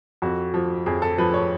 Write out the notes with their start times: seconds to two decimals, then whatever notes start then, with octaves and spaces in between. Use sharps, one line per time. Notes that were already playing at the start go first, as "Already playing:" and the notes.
0.22 F2 F#4
0.54 F3
0.86 F2 G#4
1.02 A4
1.18 F3 B4
1.34 C#5